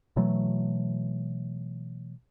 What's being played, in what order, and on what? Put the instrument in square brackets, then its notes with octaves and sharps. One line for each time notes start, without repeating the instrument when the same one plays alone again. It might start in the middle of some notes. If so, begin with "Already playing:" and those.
[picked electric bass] B2 E3 F#3 A3